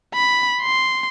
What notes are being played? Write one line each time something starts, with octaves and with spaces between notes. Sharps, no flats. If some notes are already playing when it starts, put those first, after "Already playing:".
B5
C6